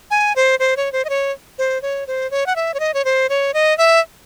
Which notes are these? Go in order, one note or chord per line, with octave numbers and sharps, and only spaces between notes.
G#5
C5
C5
C#5
C5
D#5
C#5
C5
C#5
C5
C#5
F#5
E5
C#5
D#5
C#5
C5
C#5
D#5
E5